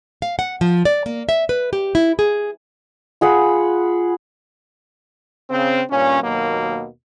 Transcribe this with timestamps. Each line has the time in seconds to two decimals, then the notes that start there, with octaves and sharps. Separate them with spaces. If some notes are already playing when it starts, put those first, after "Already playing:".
0.22 F5
0.39 F#5
0.61 F3
0.85 D5
1.06 A#3
1.29 E5
1.49 B4
1.73 G4
1.95 E4
2.19 G#4
3.21 F4 G#4 F#5 B5
5.50 C#3 C4
5.91 G2 A#2 C#4
6.22 D#2 B2 F#3 A#3